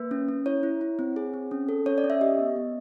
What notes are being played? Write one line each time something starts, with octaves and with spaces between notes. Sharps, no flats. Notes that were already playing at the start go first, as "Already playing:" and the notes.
Already playing: A#3 B4
C#4
C#4
E4 C#5
E4
E4
C4
G#4
C4
C#4
A4
C#4 C#5
D5
C#4
E5
G4 D#5
B3
B3